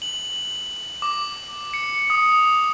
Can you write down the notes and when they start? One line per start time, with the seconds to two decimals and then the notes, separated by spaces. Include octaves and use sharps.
0.02 F#7
1.02 D6
1.74 C#7
2.10 D#6